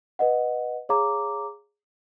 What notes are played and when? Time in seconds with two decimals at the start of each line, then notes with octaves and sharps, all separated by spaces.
0.19 B4 D#5 F#5
0.89 G#4 C#5 F5 A#5 D6